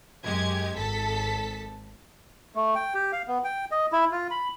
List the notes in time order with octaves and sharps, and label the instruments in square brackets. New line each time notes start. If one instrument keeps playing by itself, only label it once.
[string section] F#2 G#3 G4 G#6
G#1 A4 A5 B6
[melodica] A3
G5
G4
F5
B3
G5
D#5
E4
F4
B5